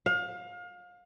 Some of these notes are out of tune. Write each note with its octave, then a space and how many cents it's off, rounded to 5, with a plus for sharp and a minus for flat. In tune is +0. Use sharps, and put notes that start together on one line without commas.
F5 +30